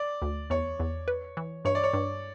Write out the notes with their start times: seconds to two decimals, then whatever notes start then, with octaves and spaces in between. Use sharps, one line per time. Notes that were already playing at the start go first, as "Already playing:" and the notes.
Already playing: D5
0.22 D2
0.50 E2 C#5
0.80 E2
1.08 B4
1.37 E3
1.65 G2 C#5
1.75 D5
1.84 C#5
1.93 G2